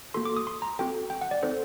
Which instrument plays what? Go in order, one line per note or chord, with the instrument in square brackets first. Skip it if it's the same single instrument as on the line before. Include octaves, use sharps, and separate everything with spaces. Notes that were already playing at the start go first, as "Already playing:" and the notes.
[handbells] A#3 F#4 A4 C6
D6
D#6
C6
A#5
C4 F#4 A4 G5
G5
F#5
D5
C4 D#4 A4 C5